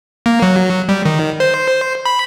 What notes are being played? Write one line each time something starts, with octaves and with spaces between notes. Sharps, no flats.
A#3
F#3
G3
D#3
C5
B5